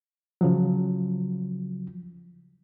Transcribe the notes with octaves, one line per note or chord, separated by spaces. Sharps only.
C#3 F3 F#3